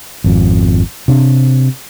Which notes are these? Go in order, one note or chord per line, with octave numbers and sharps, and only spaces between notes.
G#1 F2
C3 D4